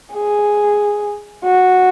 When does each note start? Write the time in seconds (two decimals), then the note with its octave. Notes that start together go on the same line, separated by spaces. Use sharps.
0.14 G#4
1.45 F#4